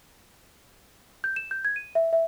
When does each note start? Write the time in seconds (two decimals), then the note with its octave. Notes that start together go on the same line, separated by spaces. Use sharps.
1.24 G6
1.36 E7
1.51 G6
1.65 G#6
1.76 D#7
1.95 E5
2.13 E5